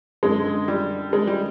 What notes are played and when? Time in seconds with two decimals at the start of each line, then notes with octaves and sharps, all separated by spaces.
0.23 F#2 D3 G#3
0.68 G3
1.13 G#3
1.27 G3